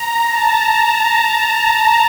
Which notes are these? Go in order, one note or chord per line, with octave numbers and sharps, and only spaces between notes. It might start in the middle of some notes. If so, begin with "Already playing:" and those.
Already playing: A#5
A5